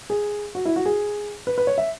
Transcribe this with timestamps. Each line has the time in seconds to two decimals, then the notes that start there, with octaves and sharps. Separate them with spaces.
0.10 G#4
0.55 F#4
0.65 E4
0.76 F#4
0.85 G#4
1.47 B4
1.58 B4
1.67 C#5
1.78 E5